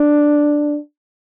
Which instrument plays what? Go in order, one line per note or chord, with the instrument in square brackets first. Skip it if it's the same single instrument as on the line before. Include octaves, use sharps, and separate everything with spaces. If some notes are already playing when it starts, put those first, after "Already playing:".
Already playing: [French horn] D4